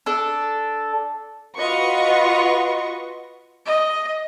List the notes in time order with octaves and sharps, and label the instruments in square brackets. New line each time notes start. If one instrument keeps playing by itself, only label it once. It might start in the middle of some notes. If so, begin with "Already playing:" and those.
[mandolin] D4 A4
[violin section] F4 F#4 B4 D#5 C#6
[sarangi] D#5